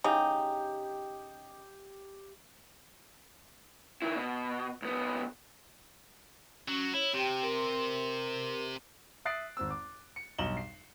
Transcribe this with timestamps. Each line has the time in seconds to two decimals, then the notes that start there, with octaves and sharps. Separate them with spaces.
0.04 C#3 D#4 G4
4.02 D#3 E4
4.16 B2
4.82 C2 B3
6.68 F#3 C#4
6.94 E4 C#5
7.14 C3 G4 G5
7.43 A#4 C6
9.25 E5 D#6 F#6 A6 C7 D7
9.57 G#1 C4 E6
9.71 D6
10.16 C#7
10.38 B1 G2 D#5 E7 F#7 G7
10.57 C7